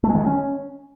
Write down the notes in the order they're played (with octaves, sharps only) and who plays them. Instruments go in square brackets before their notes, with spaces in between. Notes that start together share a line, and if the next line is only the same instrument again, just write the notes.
[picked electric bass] A3
G#3
D#3
G#3
C#4